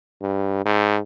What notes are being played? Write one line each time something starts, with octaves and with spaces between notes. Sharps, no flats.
G2
G#2